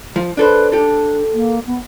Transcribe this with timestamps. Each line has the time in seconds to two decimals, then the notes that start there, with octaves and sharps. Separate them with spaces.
0.16 F3
0.37 D4 A4 B4 C5
0.72 D4 G4 A4
1.33 A#3
1.66 B3